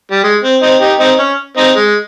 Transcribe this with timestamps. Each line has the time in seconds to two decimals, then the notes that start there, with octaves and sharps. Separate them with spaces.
0.11 G3
0.24 G#3
0.43 C4
0.62 C4 D#4
0.81 D#4 G4
1.00 C4 D#4
1.19 C#4
1.57 C4 D#4
1.76 G#3